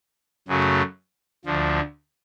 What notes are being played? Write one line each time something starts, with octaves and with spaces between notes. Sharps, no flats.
F#2 C#3 F#3 A3
D2 D3 F3